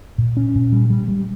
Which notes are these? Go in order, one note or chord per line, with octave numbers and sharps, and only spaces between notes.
A#2
C#4
A#2
G3
G3
G3